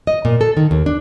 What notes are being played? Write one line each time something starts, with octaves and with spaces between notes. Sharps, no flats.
D#5
A#2
A4
D#3
D#2
D4